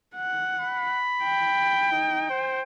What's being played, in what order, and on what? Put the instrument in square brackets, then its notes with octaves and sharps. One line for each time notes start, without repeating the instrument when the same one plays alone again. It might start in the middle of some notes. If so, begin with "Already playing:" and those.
[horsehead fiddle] F#5
[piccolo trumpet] B5
[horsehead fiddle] G5
[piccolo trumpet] D#4
C5